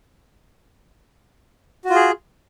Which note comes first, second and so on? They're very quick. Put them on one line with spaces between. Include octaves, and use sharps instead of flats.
F#4 F4 G#4